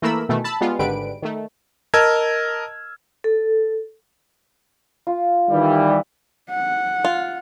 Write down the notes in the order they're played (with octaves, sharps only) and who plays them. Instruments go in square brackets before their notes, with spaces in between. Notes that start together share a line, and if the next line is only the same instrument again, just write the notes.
[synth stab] E3 A3 A#3 A#4 B5 E6
B2 D#3 E3 A3
A5 B5 E6
G3 G#3 B3 F4
G#1 G#2 D3 G3 B4 D7
D#3 A3
[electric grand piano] A#4 D#5 A5 E6 F6 G#6
[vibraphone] A4
[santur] F4
[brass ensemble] D#3 E3 G3
[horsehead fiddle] F#5
[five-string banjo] F4